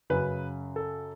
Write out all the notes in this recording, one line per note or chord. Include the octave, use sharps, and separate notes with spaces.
F#2 C#3 B4
A4